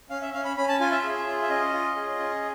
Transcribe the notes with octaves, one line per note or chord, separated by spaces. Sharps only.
C#4 F5
E5
C#4 F5
B5
C#4 B5
A5
F4 G#5
E5
G#4
F4
E5
C#4 D#5
F4
G#4
C#4